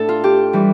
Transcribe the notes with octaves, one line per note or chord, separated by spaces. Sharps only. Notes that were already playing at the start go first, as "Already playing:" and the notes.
Already playing: A2 D4 A4
F4
G4
E3 G3